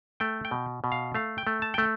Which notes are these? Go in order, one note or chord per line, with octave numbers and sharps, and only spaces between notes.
A3 G5
G5
B2
B2
F5
A3 F5
G5
A3
A5
A3 G5